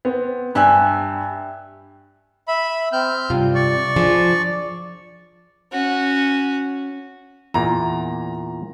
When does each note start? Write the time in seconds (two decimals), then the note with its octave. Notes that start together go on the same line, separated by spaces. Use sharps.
0.05 B3 C4
0.55 G2 G4 E5 G#5 F#6
2.48 E5 B5
2.92 C4 F6 G6
3.30 G2 C3 F4
3.55 D5 C#6
3.96 F3 D4 G#4
5.72 C#4 F#4
7.54 E2 A#2 A#5